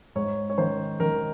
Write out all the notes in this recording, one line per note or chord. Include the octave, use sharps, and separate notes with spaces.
G#2 C#5
C#5
D#3 C5
D#3 A#4